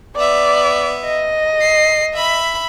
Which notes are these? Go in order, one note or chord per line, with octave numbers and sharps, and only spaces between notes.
B3 D5 E5
D#5
C7
E5 B5